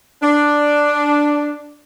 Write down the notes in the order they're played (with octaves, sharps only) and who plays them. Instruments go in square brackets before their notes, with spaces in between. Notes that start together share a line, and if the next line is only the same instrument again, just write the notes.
[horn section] D4